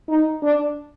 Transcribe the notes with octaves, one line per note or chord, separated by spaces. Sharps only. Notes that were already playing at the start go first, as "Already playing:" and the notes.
D#4
D4